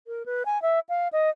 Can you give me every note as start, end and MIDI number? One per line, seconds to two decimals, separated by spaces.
0.07 0.26 70
0.26 0.43 71
0.46 0.61 80
0.62 0.80 76
0.89 1.08 77
1.13 1.30 75